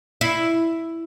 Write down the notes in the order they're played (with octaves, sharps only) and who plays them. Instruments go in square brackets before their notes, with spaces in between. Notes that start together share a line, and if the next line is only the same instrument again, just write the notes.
[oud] E4